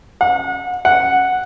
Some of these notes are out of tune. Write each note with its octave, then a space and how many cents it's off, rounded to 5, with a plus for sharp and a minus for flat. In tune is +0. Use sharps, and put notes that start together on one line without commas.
F#5 -35
F#5 -5